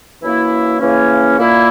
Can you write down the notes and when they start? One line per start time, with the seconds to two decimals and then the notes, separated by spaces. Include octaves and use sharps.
0.22 F#2 E3 A#3 E4
0.80 C#3 E3 A#3 C#4
1.39 A#2 A#3 E4